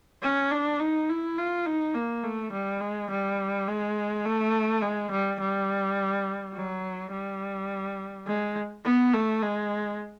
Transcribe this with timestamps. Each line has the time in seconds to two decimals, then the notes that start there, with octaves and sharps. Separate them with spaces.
0.23 C#4
0.51 D4
0.80 D#4
1.09 E4
1.38 F4
1.66 D#4
1.95 A#3
2.24 A3
2.53 G3
2.81 G#3
3.10 G3
3.68 G#3
4.25 A3
4.82 G#3
5.11 G3
5.40 G3
6.54 F#3
7.12 G3
8.27 G#3
8.85 B3
9.13 A3
9.42 G#3